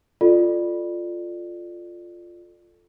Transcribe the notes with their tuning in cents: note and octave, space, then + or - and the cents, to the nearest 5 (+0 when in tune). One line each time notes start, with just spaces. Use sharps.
F4 +0 A4 +0 D5 +20